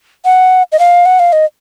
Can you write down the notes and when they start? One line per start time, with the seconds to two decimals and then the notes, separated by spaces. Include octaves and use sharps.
0.25 F#5
0.72 D#5
0.79 F5
1.06 F#5
1.20 F5
1.33 D#5